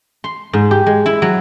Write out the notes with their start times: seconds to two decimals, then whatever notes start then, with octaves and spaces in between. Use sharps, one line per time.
0.24 C6
0.53 G#2
0.71 G4
0.86 G#3
1.06 E4
1.22 F#3